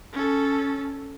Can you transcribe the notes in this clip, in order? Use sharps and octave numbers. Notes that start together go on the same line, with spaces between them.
C#4 A4